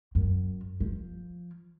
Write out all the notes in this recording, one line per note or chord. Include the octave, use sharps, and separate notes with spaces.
F#2
F3